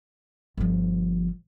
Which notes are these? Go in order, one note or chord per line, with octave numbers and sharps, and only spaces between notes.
G1 F3